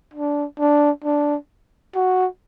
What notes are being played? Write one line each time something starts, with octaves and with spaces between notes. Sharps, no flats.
D4
D4
D4
F#4